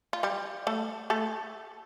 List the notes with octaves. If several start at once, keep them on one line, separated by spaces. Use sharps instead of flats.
F4
G3 G4
A3 A4
A3 A4